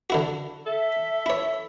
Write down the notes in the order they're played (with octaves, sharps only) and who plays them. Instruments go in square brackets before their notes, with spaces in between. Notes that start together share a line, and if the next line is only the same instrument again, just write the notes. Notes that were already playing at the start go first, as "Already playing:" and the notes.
[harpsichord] D3 E4 F#4
[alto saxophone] A4 [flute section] E5
[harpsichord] E4 C#5